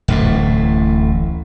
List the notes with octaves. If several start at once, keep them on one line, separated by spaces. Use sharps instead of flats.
D1 A1 A2